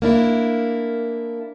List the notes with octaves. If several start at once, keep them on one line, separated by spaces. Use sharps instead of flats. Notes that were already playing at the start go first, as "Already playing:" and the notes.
A#3 D4 E4